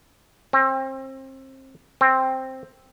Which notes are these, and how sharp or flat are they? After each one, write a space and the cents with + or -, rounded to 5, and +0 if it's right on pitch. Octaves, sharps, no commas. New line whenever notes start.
C4 +30
C4 +5